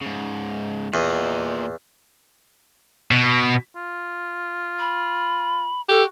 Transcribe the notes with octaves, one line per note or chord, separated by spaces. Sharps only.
G#2 C#3
E2 A#2 D#5
B2
F4
B5
F#4 G4 A4